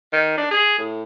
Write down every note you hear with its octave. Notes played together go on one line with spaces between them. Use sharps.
D#3
D4
G#4
A2